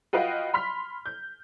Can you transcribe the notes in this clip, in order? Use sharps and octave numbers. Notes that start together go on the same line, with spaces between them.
F4 F#4 B4 D#5 F5 G5
B5 C6 F6 B6
G6